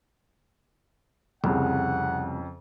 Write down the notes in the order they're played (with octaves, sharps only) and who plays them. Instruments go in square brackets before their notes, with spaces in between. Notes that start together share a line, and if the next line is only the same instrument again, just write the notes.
[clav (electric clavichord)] C2 [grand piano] F2 C#3 [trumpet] F#5